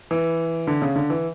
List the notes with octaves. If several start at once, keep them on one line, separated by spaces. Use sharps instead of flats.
E3
D3
C#3
D3
E3